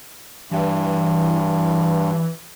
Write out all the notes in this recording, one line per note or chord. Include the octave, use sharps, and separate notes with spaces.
G2 E3